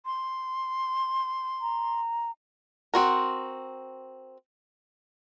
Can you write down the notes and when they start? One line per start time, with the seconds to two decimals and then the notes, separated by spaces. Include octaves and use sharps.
0.05 C6
1.61 A#5
2.94 C4 F#4 A#4